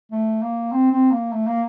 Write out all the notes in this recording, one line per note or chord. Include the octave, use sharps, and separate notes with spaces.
A3
A#3
C4
C4
A#3
A3
A#3